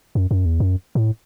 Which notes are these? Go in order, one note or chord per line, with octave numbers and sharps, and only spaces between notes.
F#2
F#2
E2
F#2
A2